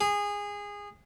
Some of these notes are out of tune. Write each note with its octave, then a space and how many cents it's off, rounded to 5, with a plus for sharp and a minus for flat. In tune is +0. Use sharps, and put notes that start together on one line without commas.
G#4 -20